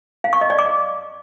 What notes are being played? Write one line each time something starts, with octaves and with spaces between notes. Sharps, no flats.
F5
C#6
D#5
D5
D6